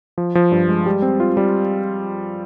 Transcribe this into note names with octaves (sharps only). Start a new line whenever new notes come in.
F3
F3
G2
G#3
G3
C4
F4
G3